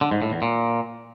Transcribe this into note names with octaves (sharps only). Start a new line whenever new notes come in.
D3
G#2
A2
E2
A#2